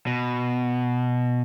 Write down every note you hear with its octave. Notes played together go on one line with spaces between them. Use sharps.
B2